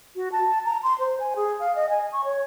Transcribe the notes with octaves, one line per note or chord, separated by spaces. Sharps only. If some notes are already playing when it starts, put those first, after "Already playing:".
F#4
A5
A#5
C6
C5
G#5
G#4
F5
D#5
G#5
C#6
C#5